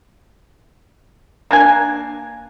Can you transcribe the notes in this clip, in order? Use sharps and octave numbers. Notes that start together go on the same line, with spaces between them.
A#3 D4 G#5